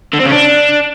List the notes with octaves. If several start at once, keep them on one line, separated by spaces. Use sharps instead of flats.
D3
C4
C#3
D4